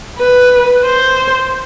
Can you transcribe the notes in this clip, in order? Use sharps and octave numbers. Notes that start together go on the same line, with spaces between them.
B4
C5